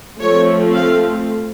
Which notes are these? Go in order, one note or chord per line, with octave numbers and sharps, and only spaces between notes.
F3 A3 C4 C#5
F5